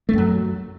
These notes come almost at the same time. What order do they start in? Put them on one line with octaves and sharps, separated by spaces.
A3 F#2 F#3